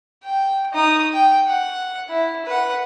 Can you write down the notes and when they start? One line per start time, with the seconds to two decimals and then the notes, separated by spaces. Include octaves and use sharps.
0.23 G5
0.73 D#4 D#6
1.14 G5
1.47 F#5
2.09 E4
2.46 B4 F#5